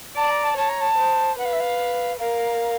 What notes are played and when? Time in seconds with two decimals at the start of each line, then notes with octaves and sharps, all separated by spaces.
0.16 D5 A5
0.30 A#5
0.43 A5
0.56 C#5 A5
0.68 A#5
0.80 A5
0.97 C5
1.38 B4 F#5
1.45 F5
1.52 E5
1.60 F5
2.19 A#4 F5